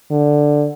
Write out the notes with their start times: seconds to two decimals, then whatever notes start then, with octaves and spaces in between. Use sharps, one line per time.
0.11 D3